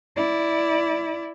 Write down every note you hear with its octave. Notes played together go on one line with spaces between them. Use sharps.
E4 D5